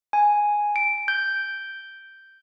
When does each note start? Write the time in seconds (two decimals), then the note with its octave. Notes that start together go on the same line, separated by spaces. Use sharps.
0.13 G#5
0.76 D7
1.08 G6